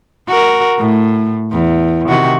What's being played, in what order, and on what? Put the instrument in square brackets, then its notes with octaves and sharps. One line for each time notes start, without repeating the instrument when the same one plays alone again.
[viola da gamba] F#4 A#4
A2
E2
C3 D#3 F#4